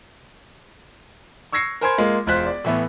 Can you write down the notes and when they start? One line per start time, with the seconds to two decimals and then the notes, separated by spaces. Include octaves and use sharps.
1.52 C#6 E6 G#6 A#6 C7 C#7
1.81 A#4 C5 G#5 B5 C6 G#6
1.98 G#3 A#3 F4
2.27 E1 G#3 F4 C5 F#6 B6
2.46 D5
2.65 A2 E3 A3 B3